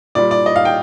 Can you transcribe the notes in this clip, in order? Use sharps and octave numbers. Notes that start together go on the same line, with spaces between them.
A#2 G3 D5
D5
D#5
F5
G5